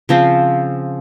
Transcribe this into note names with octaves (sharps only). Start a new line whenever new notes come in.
C#3 F3 C4